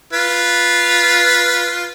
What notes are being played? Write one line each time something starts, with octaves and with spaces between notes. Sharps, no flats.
F4 B4